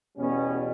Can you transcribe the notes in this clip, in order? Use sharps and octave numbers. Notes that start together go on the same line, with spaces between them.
E2 B2 G3 B3 C#4